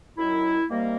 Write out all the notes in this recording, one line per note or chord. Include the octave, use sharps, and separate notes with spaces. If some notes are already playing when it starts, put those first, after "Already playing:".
F#2 D#3 F#3 E4
C3 D#3 G3 A#3